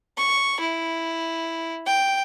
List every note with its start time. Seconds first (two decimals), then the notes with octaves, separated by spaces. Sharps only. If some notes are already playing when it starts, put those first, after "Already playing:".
0.17 C#6
0.60 E4
1.86 G5